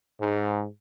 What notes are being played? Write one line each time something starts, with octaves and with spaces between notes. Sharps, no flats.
G#2